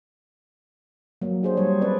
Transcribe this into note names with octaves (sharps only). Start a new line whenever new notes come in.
F#3 A#3
D4 G#4 C5
G3 C#5
C4 B4 D5